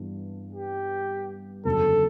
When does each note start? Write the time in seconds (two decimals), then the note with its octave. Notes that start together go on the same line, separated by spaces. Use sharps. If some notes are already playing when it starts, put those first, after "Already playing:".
Already playing: G2 E3 B3 D4
0.53 G4
1.65 F#1 E2 D3 F#3 A4